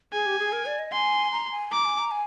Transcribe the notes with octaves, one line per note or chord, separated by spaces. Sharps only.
G#4 G#5
G4
G#4
A#4
D5
D#5
G#5 C6
A#5
G#5
A#5 D6
G#5
A#5
G#5